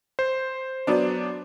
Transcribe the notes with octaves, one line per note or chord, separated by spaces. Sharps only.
C5
F#3 B3 D4